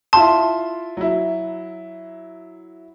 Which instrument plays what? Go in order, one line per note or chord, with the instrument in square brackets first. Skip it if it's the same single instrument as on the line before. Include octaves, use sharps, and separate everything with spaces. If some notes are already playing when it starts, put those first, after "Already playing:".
[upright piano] E4 F4 C6 [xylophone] A5
[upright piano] F#3 E4